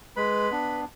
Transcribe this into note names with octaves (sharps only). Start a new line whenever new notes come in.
G#3 B4 B5
B3 D4